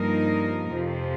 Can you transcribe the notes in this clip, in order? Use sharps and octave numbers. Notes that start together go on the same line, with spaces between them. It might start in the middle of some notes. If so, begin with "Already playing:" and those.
Already playing: G2 F3 A#3 D#4 A#4
F2 C3 F3